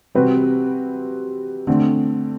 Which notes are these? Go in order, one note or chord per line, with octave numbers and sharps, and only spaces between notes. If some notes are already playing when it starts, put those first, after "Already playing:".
C3 G3 C4 F#4 B4
D3 A3 C4